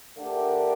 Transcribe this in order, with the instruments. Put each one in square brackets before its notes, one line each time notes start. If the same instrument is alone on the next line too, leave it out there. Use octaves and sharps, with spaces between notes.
[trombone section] D3 A3 D4 G4 A#4